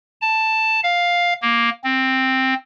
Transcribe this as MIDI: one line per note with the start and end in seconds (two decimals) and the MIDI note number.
0.21 0.80 81
0.83 1.33 77
1.42 1.70 58
1.84 2.54 60